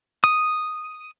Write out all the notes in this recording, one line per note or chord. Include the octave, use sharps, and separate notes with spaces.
D#6